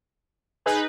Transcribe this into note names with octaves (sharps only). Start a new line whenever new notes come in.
D#4 G#4 B4